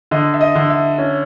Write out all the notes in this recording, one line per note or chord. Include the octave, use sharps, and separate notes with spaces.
D3 D#5
E5
D#5
D3
E5
C#4